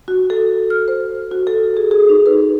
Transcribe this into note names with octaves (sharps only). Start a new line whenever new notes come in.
F#4
A4
F6
C5
F#4
A4
G#4
G#4
D#4
B4